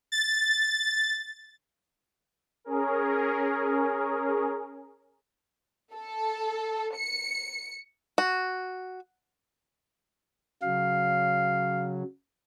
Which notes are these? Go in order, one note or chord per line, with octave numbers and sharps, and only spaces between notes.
A6
C#4 G#4 A#4
A4
C#7
F#4
C#3 F#3 F5